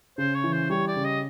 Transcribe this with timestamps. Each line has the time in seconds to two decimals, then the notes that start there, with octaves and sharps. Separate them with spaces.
0.18 C#3 C5
0.35 C#5
0.44 E3
0.53 C5
0.70 G3 C#5
0.87 D5
0.96 C#3
1.05 D#5